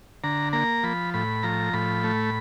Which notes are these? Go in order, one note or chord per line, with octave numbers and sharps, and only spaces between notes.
D3 A#5
A#3 A#5
F3 B5
A2 B5
F3 A#5
A2 B5
A3